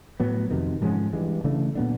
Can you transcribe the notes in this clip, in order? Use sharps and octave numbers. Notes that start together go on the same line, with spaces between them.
A2 F#3 B3
F2 C3 D#3
G#2 F3 G#3 C#4
G2 E3 G#3
C#3 E3 A3 D4
A#2 F#3 B3 D4